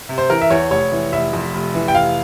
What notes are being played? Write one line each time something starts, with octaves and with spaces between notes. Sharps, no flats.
C3
C5
E3 A#4
E5
E2 C#5
F1 C#5
E3
F1 E5
F2
F1
E3
G5
F1 F5